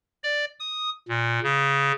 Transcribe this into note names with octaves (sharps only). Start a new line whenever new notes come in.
D5
D#6
A#2
C#3